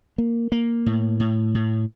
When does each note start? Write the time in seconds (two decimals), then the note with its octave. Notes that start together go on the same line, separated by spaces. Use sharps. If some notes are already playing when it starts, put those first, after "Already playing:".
0.18 A#3
0.52 A#3
0.86 A2
1.20 A2
1.55 A2